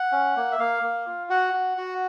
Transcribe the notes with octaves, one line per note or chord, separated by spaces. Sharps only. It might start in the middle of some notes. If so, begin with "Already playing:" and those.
Already playing: F#5
C#4
A#3
E5
A#3 F5
A#3
F4
F#4 F#5
F#4
F#4